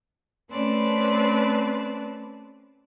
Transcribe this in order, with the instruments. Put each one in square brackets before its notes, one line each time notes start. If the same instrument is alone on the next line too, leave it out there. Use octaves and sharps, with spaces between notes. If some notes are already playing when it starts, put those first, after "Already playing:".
[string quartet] A3 C4 C#4 B4 D5 A5